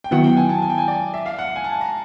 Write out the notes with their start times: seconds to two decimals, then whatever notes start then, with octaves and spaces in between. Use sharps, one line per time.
0.04 G5
0.11 D#3 F#3 B3 E4 F#5
0.24 G5
0.37 G#5
0.49 A5
0.62 G#5
0.70 G5
0.78 G#5
0.88 D5
1.14 E5
1.26 F5
1.39 F#5
1.56 G#5
1.64 A5
1.81 A#5